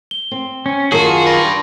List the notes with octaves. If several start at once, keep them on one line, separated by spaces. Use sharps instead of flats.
G7
C4
C#4
F#2 D#3 F4 F#4 G#4 A#4 A5 C#6
D4 G4 B5 C6 A#6